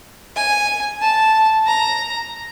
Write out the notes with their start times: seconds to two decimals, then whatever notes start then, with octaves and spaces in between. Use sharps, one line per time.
0.36 G#5
1.02 A5
1.67 A#5